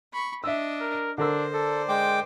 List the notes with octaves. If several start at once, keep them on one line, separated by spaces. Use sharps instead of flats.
B5 C#6
D4 D#5 E5 E6
A#4
D3 D4 A#4 C5 E6
A4 D5
G#3 G5 D6